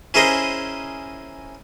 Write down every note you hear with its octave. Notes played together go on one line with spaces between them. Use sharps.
C#4 E4 G#4 A#4 C5 D#5